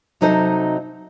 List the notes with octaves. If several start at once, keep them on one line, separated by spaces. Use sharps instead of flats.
C3 F#3 D#4 A4 C5 D#5